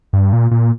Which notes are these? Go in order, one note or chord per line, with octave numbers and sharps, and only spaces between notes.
G2
A#2
A#2